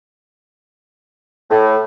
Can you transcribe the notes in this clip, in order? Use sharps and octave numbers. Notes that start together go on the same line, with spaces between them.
A2